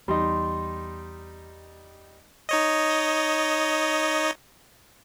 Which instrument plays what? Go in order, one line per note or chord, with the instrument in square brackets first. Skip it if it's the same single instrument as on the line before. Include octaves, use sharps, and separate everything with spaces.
[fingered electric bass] E2 [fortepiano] G3 D#4 [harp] C6
[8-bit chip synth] D#4 C#5 D#5